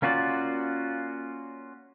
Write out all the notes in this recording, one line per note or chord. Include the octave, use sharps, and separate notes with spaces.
A#3 C#4 F4 F#4 D5